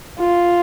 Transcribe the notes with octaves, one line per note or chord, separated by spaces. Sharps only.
F4